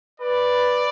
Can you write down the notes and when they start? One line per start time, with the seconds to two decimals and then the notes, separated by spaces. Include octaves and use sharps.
0.20 B4 D5